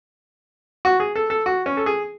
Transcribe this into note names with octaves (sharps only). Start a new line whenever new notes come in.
F#4
G#4
A4
A4
F#4
C#4
A4
G#4